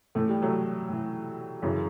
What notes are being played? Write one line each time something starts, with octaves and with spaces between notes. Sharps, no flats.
A2 E3 A3
G3
F#3 A3
A2 E3
F#2 C#3 E3